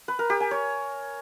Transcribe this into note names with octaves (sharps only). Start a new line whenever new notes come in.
B4
A#4
G4
G#5
C#5